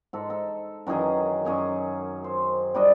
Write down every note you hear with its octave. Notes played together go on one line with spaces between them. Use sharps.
G#2 A4
A4
F#2 D#3 E3 G#4
F#2 G#4 C#5
C5
G3 D4 D#5